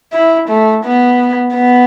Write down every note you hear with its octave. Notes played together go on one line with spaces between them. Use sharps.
E4
A3
B3
B3